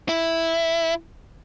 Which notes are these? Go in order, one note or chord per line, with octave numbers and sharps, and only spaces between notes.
E4